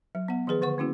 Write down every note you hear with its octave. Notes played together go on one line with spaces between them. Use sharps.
F#3
B3 F#5
D#3 F3 G#4 B4
D3 B4 F#5 C#6
A#3 C#4 E4 F#4